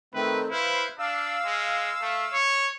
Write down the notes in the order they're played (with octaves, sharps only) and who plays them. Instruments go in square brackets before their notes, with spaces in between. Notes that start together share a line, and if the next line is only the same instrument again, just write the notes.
[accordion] D#3 A3 C4 [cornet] B4
[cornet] E4 [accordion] B4 C5 F5
[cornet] D4 [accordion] F5 E6
[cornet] G#3
A3
C#5